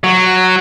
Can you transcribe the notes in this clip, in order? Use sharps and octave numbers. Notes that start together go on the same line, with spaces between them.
F#3